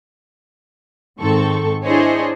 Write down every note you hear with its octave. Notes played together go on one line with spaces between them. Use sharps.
G#2 D#3 C4 A4 C#6
D4 E4 G#4 C5 C#5 D#5